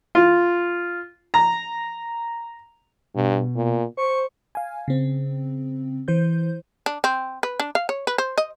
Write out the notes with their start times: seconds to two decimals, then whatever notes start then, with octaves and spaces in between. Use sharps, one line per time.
0.15 F4
1.34 A#5
3.15 G2 B2
3.55 A#2
3.97 C5 C#6
4.55 F5 G#5
4.88 C#3 C4
6.08 E3 C5 G6
6.86 D4
7.04 C4
7.43 B4
7.60 D4
7.75 F5
7.89 C#5
8.07 B4
8.18 C5
8.38 D#5